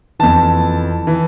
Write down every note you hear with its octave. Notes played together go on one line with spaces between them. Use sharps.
F2 E3 A5
E3